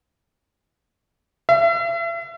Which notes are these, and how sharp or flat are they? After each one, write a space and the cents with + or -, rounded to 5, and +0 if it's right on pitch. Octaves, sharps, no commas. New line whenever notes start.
E5 +40